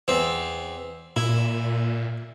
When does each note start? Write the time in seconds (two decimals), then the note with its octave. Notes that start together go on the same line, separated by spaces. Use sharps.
0.08 E2 C4
1.16 A#2 E4